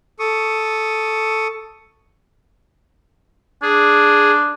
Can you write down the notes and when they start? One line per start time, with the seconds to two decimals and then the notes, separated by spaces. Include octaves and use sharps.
0.19 A4 C#6 D#6
3.62 D4 G#4